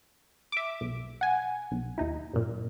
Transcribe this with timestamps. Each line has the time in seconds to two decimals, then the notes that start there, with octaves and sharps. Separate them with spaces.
0.52 E5 D6
0.81 B1
1.21 F#5 G#5
1.71 B1
1.98 D#2 D#4 E4
2.33 F#2 A#2